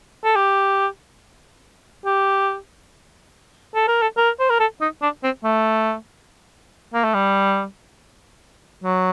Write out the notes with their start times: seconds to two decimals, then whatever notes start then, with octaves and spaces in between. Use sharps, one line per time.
0.24 A4
0.36 G4
2.05 G4
3.75 A4
3.88 A#4
4.02 A4
4.17 A#4
4.40 C5
4.50 A#4
4.60 A4
4.81 D#4
5.02 D4
5.23 C4
5.44 A3
6.94 A#3
7.04 A3
7.14 G3
8.84 F#3